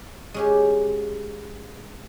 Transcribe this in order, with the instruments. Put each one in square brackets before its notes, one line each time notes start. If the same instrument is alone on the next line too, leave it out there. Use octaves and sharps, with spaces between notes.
[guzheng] G#3 C#4 G4